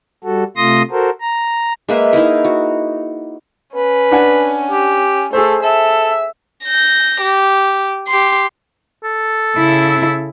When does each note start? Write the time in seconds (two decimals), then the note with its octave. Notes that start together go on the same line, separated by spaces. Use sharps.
0.24 G3 F#4 A4
0.57 C3 A3 F4 C6 D#6 A#6
0.91 F#4 A4 A#4 C5
1.20 A#5
1.89 G#3 A#3 B4 E5
2.13 D#4 E4 G#4 A#4
2.45 F#4
3.76 C#4 B4
4.12 D4 F#5 G#5
4.71 G4
5.33 A3 G#4 A4 C5
5.63 A4 E5
6.64 G6 A#6
7.21 G4
8.08 G4 C6
9.04 A4
9.57 C#3 E4